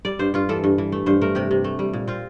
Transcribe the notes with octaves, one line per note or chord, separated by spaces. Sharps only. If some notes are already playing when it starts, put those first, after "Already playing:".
G3 D5
G2 C5
G2 F4
E3 A4
G2
E3
A3
G2 C5
A3 A#4
C3 G4
C3
A3
G3
A#2
C4 F4